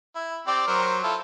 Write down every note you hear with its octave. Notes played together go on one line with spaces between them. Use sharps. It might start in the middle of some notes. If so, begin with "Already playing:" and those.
E4
C4 G4 D5
F#3 A#4 C5
E4 F4 A4